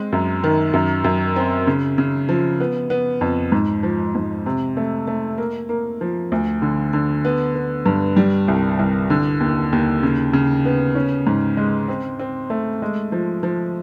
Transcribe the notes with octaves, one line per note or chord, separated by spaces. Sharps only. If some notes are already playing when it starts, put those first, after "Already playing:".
Already playing: G#3 C4
F#2
D#3
F#2
F#2
C4
C#3
C#3
F3
B3
B3
F2
G#2
F3
G#2
C3
A3
A3
A#3
A#3
F3
D2
D3
D3
B3
B3
G2
G3
C2
C2
D3
D#2
D#2
C#3
C#3
B3
C#4
G#2
G#3
C4
C4
A3
G#3
F3
F3